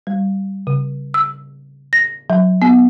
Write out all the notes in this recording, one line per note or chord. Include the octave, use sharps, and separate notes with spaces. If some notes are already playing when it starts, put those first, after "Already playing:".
G3
C#3
E6
A#6
F#3
B3